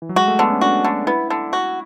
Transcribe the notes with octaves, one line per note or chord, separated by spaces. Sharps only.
E3
F#3
G#3 F#4
A3
D3 B3
C#4
D4 F#4
D3
B3 E4
D3
F#4